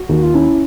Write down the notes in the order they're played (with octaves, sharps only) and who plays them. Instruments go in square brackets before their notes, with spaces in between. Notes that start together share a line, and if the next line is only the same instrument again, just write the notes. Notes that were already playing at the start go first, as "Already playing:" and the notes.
Already playing: [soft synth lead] F#4
[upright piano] D#2
[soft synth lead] F4
[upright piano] C#4 [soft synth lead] E4